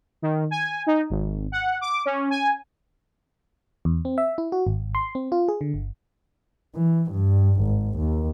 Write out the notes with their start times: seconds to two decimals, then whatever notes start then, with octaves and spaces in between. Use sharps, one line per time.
0.22 D#3
0.51 G#5
0.87 D#4
1.10 G#1
1.52 F#5
1.81 D6
2.05 C#4
2.30 G#5
3.85 E2
4.05 C4
4.18 E5
4.38 E4
4.52 F#4
4.67 G#1
4.95 C6
5.15 C4
5.32 F4
5.48 G#4
5.61 D3
5.74 G1
6.75 E3
7.11 G2
7.61 G#1
7.98 D#2